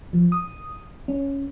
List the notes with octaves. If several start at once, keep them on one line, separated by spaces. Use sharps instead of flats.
F3
D#6
C#4